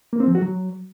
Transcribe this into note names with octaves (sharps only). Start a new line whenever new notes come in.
A#3
C4
F3
F#4
F#3